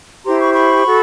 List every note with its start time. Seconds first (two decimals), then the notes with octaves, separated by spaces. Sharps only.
0.24 E4 G4 C5 A#5 C6
0.40 B5 C#6
0.54 B5 C#6
0.84 F#4 A4